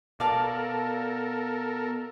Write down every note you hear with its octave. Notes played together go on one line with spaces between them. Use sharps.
B2 A4 A#4 D5 F5 A5